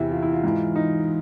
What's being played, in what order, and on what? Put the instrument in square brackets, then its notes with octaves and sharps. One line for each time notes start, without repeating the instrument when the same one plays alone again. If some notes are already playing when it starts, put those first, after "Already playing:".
Already playing: [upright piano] E2 C3 E3 E4
F4
E4
F4
G#2 E3
D#4